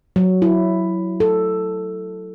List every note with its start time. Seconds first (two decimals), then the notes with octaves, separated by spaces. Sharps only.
0.16 F#3
0.42 E4
1.20 A4